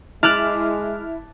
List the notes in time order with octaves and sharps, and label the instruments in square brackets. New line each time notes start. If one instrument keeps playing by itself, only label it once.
[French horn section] G#3 [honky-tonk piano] E4 [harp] A5 D6 F#6 [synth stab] F6